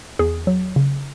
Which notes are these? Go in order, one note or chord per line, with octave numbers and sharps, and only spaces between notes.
E2 G#4
F#3
C#3